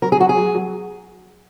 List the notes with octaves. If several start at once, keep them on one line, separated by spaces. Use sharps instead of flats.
F#3 A#4
G#4
F#3 F#4
G#4
F#3
F#3